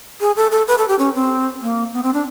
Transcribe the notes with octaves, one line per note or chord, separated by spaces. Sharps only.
G#4
A4
A4
B4
A4
G4
C#4
C4
A#3
B3
C4
D4